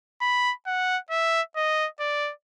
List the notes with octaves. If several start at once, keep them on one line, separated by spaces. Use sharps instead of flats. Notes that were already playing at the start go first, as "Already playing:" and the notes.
B5
F#5
E5
D#5
D5